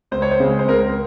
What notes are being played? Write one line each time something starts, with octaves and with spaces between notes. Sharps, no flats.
C#2 C5
C#5
C5
C#3 G#3 C4
C5
C#2 A#4